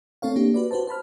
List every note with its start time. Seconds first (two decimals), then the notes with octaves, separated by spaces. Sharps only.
0.22 A3 C4 A4 C#5 F5
0.36 A#3 D4 G4
0.54 F#4 B4 D5
0.71 F#4 G4 B4 C5 A5
0.87 C5 A5 B5 F6